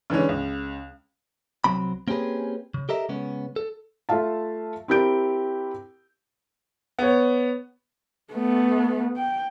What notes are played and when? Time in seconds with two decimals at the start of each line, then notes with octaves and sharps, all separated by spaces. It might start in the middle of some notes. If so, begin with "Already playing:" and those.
0.10 D3 E3 G#3 C#4
0.29 C#2
1.64 C2 F#3 C4 B5
2.08 A#3 C4 C#4 G4 G#4 B4
2.74 C#3
2.89 G4 A4 A#4 D#5 E5
3.09 C#3 G#3 B3 C#4
3.56 A4
4.09 A3 F4 E5 F5 A5
4.88 C4 E4 G4 A#4 G6 D7
6.99 B3 C#5
8.33 A3 B3
9.17 G5